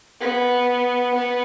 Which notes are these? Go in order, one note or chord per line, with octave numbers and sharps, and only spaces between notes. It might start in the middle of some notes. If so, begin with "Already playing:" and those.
B3
B3